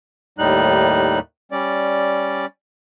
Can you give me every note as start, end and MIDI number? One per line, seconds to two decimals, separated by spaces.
0.39 1.19 39
0.39 1.19 45
0.39 1.19 55
0.39 1.19 63
0.39 1.19 90
1.52 2.46 55
1.52 2.46 61
1.52 2.46 74